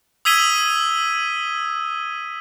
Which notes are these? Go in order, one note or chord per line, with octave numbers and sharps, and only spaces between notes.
D#6 E6 G#6 B6 D#7 G7